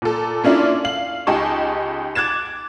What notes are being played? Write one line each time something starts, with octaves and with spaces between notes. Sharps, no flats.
A#2 A4
A#3 C#4 D4 E4 F4
F5 F#7
C#2 D#4 G4 G#5 A5 C#6
D6 F#6 G#6 A6 E7